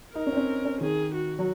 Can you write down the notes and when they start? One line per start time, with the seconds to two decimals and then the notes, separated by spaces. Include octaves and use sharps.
0.15 D#4 A#4
0.26 C#4
0.32 C4
0.37 C#4
0.65 C#4
0.81 D#3 G#4
1.14 F#4
1.39 F#3